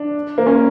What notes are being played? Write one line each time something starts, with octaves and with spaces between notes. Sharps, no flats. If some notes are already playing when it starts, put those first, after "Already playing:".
Already playing: D4
A#3
C#4